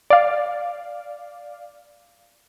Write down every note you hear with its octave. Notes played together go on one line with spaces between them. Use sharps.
D5 F5